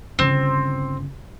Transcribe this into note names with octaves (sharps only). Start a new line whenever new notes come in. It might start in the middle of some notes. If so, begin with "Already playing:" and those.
G1 C#3 C4